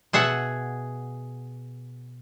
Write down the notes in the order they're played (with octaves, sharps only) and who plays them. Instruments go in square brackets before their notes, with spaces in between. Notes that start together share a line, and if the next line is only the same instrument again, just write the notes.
[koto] B2 G#4 E5 F#5